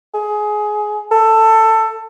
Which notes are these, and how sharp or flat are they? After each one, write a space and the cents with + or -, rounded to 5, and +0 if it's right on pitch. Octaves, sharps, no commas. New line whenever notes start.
G#4 +20
A4 +15